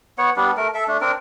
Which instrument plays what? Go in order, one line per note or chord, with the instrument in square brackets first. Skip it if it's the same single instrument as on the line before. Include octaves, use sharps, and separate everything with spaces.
[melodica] B3 C#5 F#5
G3 B3 D4
A3 A#4
A4 E5
A3 D4
C4 D4 A#4